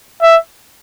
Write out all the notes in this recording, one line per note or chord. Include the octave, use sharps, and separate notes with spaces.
E5